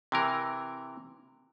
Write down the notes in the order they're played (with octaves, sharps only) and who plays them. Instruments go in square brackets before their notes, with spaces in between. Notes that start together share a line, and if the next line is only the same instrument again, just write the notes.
[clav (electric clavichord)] C3 E3 A#4